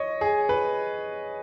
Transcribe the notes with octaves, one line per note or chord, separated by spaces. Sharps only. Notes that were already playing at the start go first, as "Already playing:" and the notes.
Already playing: C#5 D#5
G#4
B4